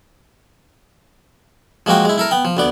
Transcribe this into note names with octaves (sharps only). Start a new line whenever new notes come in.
F3 G#3 A#3 F#4 G5
G#3 E4
E4 A4 A#4
B3 G5
F3
D2 B3 D5